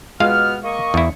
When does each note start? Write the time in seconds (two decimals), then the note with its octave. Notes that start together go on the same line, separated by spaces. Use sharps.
0.20 B2 G#3 B3 F4 F5 F6
0.64 A#3 D#5 C#6
0.94 E2 E4